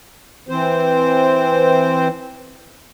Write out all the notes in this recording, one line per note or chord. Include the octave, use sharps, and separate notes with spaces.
E3 C4 C5